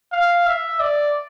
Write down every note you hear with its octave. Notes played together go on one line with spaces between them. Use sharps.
F5
E5
D5